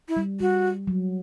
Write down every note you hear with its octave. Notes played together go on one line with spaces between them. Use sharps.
E4
G3
G3 F#4
F#3